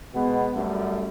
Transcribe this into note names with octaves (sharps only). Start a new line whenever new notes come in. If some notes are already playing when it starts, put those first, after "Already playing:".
B2 G#3 B3
F#2 G3 A3